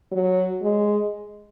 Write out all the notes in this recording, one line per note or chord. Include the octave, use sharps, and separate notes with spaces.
F#3
G#3